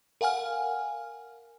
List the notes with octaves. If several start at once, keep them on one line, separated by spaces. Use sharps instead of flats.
A#4 F5 F#5 G#5 F6